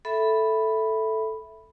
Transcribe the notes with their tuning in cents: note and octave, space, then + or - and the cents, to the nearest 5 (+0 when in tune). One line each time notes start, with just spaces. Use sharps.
A4 +0 E5 +0 B5 +0